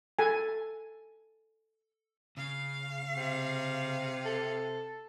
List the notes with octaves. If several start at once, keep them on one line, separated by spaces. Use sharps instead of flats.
A4 G#5
C#3 F5
C3
A4